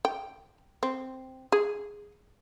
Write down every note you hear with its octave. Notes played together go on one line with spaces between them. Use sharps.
G5
C4
G#4